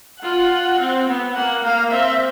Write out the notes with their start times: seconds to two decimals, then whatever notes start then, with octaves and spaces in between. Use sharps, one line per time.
0.22 F4 F#5
0.79 C4
1.07 B3
1.34 A#3 F#5
1.63 A#3 F5
1.91 C4 E5